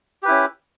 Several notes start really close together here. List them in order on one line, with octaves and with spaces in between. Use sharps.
G4 B4 E4 C#4